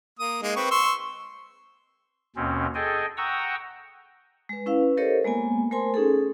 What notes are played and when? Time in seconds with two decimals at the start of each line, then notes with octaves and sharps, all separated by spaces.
0.20 A#3 D#6
0.43 G#3 A#3 D#4
0.56 C4 B4 C#6
0.71 C6 C#6 E6
2.36 D#2 B2 C4 C#4
2.75 G#4 A4 D#5 G5 G#5
3.17 F#5 G5 A#5 C#6 D#6 E6
4.49 G#3 B4
4.66 C#4 E4 B4 F5
4.97 G4 A4 A#4 C5 C#5 D#5
5.24 G#3 A#3 B3 G#5
5.71 A3 A#4 C5 G#5 C6
5.94 C#4 D#4 G#4 A4